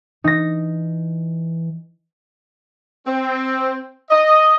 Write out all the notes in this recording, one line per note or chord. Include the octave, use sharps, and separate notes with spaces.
E3 D#4 A#6
C4
D#5